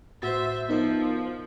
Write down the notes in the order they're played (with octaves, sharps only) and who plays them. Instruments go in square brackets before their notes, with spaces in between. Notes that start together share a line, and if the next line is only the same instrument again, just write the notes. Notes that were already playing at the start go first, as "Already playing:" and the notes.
[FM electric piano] A2 F#4 A6 [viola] C5 E5
[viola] F3 [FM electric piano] B3 D#4 A#4